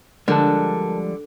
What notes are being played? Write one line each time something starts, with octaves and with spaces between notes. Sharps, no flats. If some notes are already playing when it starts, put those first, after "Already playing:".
D3 F3 G3 G#3 A#4 A5